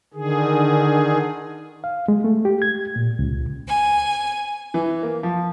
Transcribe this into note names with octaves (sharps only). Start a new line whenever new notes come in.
D3 D#3 G#4
F5
G#3
A3
G4
G#6
A#2
C#2
G#5
E3
A#3
F3